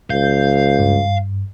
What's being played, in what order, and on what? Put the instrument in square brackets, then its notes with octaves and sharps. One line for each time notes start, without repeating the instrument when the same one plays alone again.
[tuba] C#2 [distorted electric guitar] F5 [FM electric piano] G6
[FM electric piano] G2